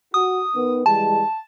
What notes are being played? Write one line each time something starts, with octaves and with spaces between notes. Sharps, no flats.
F#4 D#6
D#3 B3
E3 G3 G#3 A5